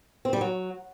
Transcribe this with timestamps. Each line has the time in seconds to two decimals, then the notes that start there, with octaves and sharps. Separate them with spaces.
0.25 C4
0.33 G3
0.41 F#3